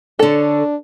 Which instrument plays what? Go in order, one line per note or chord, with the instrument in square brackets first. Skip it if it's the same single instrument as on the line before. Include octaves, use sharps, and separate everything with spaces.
[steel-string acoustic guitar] D3 C#5 [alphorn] D4 [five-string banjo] A4